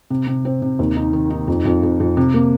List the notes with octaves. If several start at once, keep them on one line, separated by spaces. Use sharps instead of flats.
C3
C3
C4
C3
D#2
D#4
D#3
D#4
F2
F2
F2
F2
C3
A#3